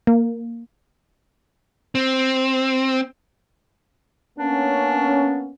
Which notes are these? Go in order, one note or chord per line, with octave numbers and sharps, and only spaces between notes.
A#3
C4
A#3 B3 C#4 D4